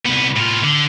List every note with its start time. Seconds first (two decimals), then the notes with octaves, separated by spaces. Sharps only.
0.06 C2 B3
0.37 A2 F4
0.64 D3